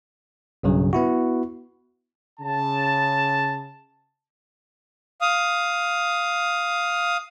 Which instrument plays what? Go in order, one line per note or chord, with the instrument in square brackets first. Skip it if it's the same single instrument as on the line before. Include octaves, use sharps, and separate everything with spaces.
[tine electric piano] B1 G2 C#3 F#3
B3 E4 F#4
[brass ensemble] C#3 A5
[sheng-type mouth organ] F5 D#6